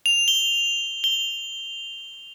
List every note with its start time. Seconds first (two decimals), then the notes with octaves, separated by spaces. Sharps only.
0.06 F7
0.28 G7
1.04 G7